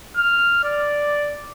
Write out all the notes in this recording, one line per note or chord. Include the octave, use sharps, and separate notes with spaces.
F6
D5